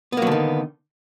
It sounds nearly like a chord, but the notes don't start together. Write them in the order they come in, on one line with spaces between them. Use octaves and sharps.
B3 A#3 F#3 D3 D#3